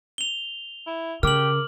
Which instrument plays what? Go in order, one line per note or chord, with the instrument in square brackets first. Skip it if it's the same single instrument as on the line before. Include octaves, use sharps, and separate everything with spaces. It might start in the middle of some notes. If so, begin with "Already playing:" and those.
[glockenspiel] F7 G7
[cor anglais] E4
[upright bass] C#3 [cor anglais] G4 [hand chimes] A#4 D6 [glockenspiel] F6 F#7